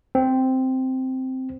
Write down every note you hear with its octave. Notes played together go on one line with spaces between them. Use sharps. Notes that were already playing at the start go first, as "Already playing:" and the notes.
C4